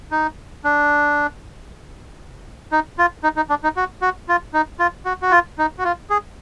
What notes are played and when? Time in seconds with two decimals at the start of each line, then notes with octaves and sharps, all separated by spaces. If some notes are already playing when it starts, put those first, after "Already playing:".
0.11 D#4
0.64 D4
2.72 D#4
2.98 F4
3.23 D#4
3.36 D#4
3.50 D4
3.64 D#4
3.77 F#4
4.02 F#4
4.29 F4
4.54 D#4
4.79 F4
5.05 F#4
5.22 F#4
5.31 F4
5.59 D#4
5.79 F#4
5.84 F4
6.10 G#4